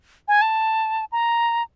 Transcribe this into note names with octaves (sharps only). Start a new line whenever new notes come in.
G#5
A5
A#5